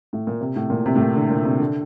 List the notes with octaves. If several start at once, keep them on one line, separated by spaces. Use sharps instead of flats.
A2
A#2
C3
A2
A#2
C3
A2
A#2
D3
A#2
C3
D3